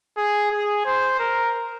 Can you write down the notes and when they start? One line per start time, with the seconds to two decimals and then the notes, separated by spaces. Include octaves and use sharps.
0.17 G#4
0.52 G#4
0.86 C5
1.20 A#4